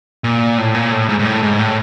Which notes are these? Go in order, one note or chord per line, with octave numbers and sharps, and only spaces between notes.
A#2
A2
A#2
A2
G#2
G#2
A2
G#2
A2